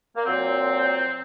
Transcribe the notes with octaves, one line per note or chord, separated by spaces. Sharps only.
A#3
A#2 F#3 C4